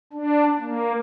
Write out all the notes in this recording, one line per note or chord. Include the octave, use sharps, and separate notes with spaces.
D4
A#3